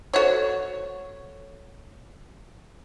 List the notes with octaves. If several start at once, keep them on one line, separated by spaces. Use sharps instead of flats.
F#4 A4 C5 C#5 F#5